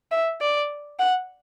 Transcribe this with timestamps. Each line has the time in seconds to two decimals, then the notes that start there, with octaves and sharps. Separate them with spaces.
0.11 E5
0.41 D5
0.99 F#5